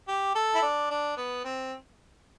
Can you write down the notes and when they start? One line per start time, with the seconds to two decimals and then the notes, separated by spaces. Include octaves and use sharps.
0.08 G4
0.35 A4
0.55 E4
0.62 D4
0.90 D4
1.17 B3
1.44 C4